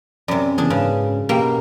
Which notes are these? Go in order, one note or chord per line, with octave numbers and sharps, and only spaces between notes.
F#2 C3 D5
C#3 E3 B3 D4 G#4
G#2 C#3 B4
B2 A#3 G4 G5